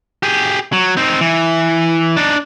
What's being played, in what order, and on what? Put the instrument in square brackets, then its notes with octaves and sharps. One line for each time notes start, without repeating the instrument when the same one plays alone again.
[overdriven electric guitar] G4 G#4
F#3
C4 D#4
E3
D4 D#4